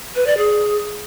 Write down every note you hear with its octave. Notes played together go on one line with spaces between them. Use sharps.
B4
D5
G#4